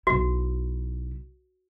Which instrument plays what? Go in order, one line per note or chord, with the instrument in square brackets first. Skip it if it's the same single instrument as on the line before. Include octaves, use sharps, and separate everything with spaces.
[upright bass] B1 E4 [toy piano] F#4